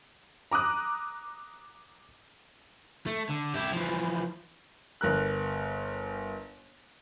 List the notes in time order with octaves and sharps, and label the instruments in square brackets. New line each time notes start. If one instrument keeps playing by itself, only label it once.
[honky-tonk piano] A#5 D6 D#6 F#6
[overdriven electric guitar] A3
D3
E4 G4
E3 F3
[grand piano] G1 A#4 F#6